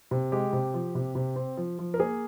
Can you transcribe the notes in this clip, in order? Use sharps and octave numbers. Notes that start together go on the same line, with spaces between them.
C3
G#3 G4
C3
F3
C3
C3
C4
F3
F3
A#4
A#3 G#4